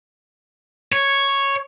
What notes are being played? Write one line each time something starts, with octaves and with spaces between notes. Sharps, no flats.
C#5